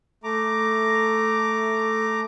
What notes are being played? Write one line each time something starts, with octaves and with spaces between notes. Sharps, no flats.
A3 A#5 D6